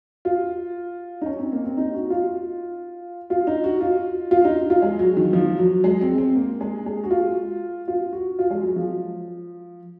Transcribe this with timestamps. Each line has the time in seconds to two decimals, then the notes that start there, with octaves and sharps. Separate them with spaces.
0.25 F4
1.21 D#4
1.26 C#4
1.39 C4
1.52 A#3
1.64 C4
1.77 D#4
1.94 F#4
2.10 F4
3.30 F4
3.47 D#4
3.64 F#4
3.80 F4
4.31 F4
4.45 D#4
4.70 F4
4.82 G#3
4.99 F#3
5.17 D#3
5.33 F3
5.58 F#3
5.84 G#3
6.01 C4
6.18 C4
6.35 A#3
6.61 G#3
6.86 G#3
7.04 F#4
7.11 F4
7.88 F4
8.13 F#4
8.39 F4
8.50 G#3
8.63 F#3
8.76 F3